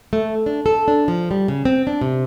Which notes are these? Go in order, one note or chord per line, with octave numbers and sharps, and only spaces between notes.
A3
D4
A4
D4
F3
G3
C#3
C4
D4
C3